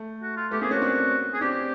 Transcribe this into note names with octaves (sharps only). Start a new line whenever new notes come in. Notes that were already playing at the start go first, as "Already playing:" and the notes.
Already playing: A3
F#4
F4
A3 B3 G4
A#3 C4 G#4
B3 C#4 F#4
C4 D4
G#4
C4 D4 G4